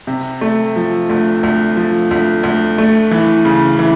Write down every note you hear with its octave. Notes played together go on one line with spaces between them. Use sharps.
C3
A3
F3
D2
D2
F3
D2
D2
A3
E3
C#3
E3